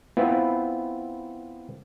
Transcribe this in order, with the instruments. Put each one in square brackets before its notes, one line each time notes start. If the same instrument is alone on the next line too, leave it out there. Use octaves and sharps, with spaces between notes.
[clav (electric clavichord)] B3 C4 E4 F4 B4